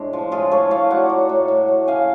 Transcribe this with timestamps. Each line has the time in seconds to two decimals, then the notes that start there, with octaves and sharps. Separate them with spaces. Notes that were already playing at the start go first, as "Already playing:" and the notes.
Already playing: A2 G#3 D4
0.13 F3
0.32 A2 F4 G#4
0.51 A2 A4 C#5
0.71 A2 C#5 F5
0.90 F#3 D5 F#5
1.09 F#3
1.29 A2
1.48 A2
1.68 A3
1.87 C#3 F5 G#5